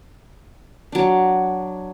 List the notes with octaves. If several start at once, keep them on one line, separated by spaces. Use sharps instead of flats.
F#3 D4